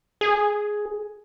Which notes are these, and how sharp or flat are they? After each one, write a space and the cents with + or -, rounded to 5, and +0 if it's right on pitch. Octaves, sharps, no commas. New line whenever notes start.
G#4 +5